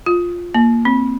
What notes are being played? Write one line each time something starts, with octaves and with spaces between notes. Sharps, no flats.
F4
A#3
C4